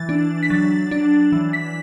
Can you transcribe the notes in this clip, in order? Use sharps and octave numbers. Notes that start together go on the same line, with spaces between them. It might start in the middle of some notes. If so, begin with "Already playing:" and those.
Already playing: E3 A6
D4
B6
F#3 A6
D4
E3
B6